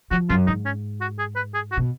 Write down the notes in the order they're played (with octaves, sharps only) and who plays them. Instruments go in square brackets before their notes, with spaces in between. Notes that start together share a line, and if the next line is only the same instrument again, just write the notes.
[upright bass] F3 [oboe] F#4
[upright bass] F#2 [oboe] F4
[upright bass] G#2 [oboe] D#4
[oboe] C#4
F#4
G#4
B4
G#4
F#4
[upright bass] B2